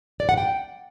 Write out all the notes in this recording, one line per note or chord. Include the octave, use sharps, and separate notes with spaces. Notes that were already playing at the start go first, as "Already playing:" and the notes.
D5
F#5
G5